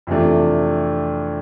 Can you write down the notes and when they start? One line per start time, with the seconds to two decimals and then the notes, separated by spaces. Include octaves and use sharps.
0.07 F2 C3 E3 A3 D4